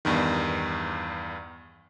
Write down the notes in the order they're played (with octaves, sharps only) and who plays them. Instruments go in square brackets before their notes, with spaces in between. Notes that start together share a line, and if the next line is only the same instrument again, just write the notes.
[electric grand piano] E2 G2 D#3